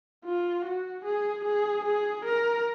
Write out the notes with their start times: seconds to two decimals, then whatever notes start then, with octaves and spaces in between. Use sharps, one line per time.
0.25 F4
0.65 F#4
1.05 G#4
1.45 G#4
1.85 G#4
2.25 A#4